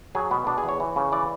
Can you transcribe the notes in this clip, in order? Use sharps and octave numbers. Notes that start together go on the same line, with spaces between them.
F#3 G#4
B2 B3
B2 D4
G#4
E2
C#5
E3
C#3
E3 D5